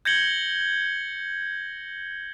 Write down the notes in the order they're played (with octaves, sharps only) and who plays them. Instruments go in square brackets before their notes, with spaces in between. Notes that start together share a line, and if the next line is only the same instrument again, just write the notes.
[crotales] G6 G#6 A#6 C#7 F#7 G7